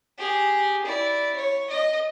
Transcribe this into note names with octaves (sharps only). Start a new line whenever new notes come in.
G4 G#4
E4 D5
C#5
D#5